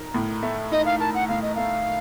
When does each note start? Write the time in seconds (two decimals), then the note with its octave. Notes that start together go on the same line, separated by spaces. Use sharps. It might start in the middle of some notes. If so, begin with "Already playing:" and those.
Already playing: D#4 A#4
0.14 A2
0.43 A3
0.72 D#4 D#5
0.86 F5
1.00 A#4 A5
1.14 F#5
1.29 A2 F5
1.42 D#5
1.55 A3 F5